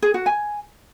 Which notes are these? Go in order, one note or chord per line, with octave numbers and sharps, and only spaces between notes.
G#4
F#4
G#5